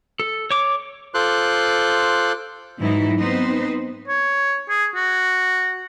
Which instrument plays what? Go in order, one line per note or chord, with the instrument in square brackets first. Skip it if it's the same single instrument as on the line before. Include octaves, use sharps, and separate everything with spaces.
[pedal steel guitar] A4
C#5 D6
[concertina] F4 A4 C5 C6 D6 F#6
[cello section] G#2 E3 F#3 D#4 E4
B3 C4 D#4 B4 C5
[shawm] C#5
G#4
F#4